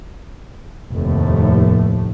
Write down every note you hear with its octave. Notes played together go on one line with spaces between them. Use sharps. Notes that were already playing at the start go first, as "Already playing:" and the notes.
F1 D#2 A2 A3